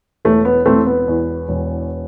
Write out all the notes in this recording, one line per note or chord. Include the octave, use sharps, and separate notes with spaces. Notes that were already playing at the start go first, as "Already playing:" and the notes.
E1 A3
B3
E1 A3 C4
B3
E2
E1